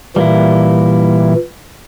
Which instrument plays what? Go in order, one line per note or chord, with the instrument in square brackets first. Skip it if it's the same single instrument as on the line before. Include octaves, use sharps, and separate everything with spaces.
[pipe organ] A#2 E3 [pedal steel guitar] G3 A#3 E4